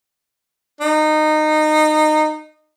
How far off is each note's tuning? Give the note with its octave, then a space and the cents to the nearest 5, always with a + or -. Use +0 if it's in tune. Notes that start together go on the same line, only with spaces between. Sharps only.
D#4 -20